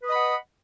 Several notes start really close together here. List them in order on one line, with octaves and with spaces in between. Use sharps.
B4 D#6 D#5 B5 F#5